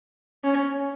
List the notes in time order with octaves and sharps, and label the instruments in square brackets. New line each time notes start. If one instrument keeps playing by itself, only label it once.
[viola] C#4